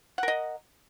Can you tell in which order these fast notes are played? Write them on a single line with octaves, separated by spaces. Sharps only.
F#5 A#4 D#5